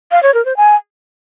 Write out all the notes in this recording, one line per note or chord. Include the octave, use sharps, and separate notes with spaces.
F5
C#5
A#4
C5
G#5